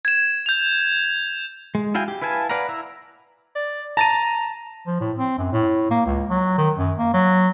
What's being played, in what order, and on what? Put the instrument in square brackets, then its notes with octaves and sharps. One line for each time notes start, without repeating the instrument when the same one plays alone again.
[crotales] G#6 E7
G6 F7
[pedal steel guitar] G#3
E4 F#4 F5 G5 G#5
G4
E4 B4 F5 G#5 A5
B4 D5 F5 F#5 A#5
E4 E5 A#5
[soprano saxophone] D5
[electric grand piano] A5 A6 D#7 [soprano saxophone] A#5
[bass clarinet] F3
A2
C4
F#2
A2
A#3
C#2
F#3
D#3
F#2
A#3
F#3